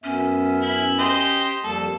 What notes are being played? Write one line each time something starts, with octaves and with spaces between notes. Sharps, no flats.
F#2 B3 C#4 E5
E4
G4 C5 D#5
F2 G3 A#3 A4